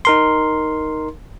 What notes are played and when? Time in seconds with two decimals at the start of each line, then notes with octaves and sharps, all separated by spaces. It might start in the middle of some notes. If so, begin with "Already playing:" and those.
0.05 D#4 A#4 C6